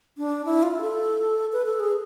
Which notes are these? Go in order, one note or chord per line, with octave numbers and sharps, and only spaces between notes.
D4
E4
F4
A4
B4
A4
G#4